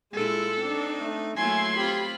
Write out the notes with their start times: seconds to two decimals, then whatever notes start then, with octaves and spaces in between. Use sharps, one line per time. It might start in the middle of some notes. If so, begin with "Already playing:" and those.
0.13 A#2 G#3 E4 F4 A4
0.60 C4 D4 D#4
0.99 A3
1.36 F#3 A3 A#3 E4 G#5 C6 G#6
1.76 C4 F4 G4 B5